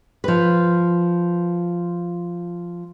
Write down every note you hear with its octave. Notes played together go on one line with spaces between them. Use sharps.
F3 B4